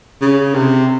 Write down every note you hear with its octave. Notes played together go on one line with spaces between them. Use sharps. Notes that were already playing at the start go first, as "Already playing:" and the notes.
C#3
C3